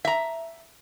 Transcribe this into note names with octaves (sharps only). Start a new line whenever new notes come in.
E5 A#5